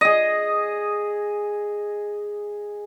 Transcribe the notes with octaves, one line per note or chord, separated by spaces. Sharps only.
G#4 D#5